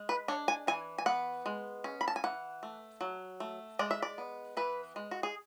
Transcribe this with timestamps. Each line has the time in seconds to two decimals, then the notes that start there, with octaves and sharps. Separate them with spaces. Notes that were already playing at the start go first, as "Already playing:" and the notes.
Already playing: G#3
0.09 B4
0.28 D4 C#5
0.48 G#5
0.67 E3 G#5
0.98 G#5
1.06 B3 F#5
1.46 G#3
1.84 C#4
2.01 B5
2.08 A5
2.16 G#5
2.24 E3 F#5
2.63 A3
3.01 F#3
3.40 A3
3.79 G#3 D5
3.91 E5
4.02 D5
4.18 B3
4.57 E3 B4
4.96 G#3
5.11 F#4
5.23 G#4